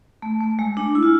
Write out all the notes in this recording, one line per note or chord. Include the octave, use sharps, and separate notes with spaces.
A3
A3
G#3
D4
E4
F4